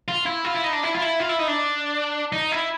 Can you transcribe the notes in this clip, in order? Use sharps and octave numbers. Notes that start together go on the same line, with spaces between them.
F4
E4
F4
E4
D#4
D4
E4
F4
E4
F4
E4
D#4
D4
D#4
E4